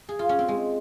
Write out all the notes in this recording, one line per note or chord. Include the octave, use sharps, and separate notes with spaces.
G#4
F4
C#4
C4
G#3